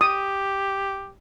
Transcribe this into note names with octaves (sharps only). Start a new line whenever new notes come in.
G4 D#6